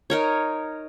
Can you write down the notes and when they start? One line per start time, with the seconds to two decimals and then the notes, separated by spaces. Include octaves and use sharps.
0.10 D#4 A#4 C#5